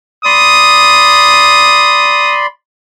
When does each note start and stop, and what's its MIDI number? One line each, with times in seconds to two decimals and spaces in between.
0.25 2.47 74
0.25 2.47 83
0.25 2.47 84
0.25 2.37 87